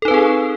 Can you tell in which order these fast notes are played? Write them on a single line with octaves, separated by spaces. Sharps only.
A4 D#4 B4 C4 G#4